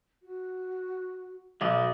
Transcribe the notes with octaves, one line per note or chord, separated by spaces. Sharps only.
F#4
B1 F#3 D5 D#5